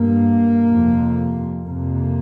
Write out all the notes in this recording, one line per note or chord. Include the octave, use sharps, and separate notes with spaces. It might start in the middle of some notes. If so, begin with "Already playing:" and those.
Already playing: G2 A#3
F2 C3
F2 C3 A#3